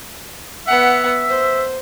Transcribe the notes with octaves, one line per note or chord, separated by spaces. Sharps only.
B3 E5 F#5
C5